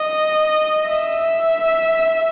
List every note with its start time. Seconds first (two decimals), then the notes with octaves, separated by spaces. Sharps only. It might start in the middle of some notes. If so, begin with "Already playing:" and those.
Already playing: D#5
0.89 E5